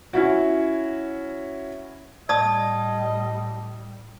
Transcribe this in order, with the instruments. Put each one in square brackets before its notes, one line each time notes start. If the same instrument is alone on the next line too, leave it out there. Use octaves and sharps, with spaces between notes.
[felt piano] C#4 E4 F#4
[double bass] A2 G3 [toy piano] D5 D#6 [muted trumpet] D#5 [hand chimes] A5